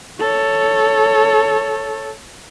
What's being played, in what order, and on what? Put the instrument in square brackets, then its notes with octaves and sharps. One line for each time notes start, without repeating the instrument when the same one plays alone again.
[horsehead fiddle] A4 C#5